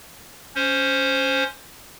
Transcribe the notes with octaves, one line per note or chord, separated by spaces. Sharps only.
C#4 C5